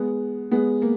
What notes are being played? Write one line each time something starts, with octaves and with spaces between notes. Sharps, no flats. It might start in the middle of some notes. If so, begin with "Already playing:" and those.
Already playing: G#3 B3
G#3 B3
A#3